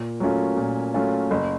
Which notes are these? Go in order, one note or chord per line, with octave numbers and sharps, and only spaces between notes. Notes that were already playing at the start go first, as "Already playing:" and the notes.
Already playing: A#2
F#3 A3 C#4 F4
A#2
F#3 A3 C#4 F4
F#1